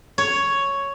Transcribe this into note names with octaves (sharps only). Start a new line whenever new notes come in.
C#5